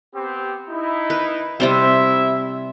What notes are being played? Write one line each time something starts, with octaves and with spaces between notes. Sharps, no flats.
B3 C4 G4
D#4 E4
B4
C3 G3 C4 E4 E5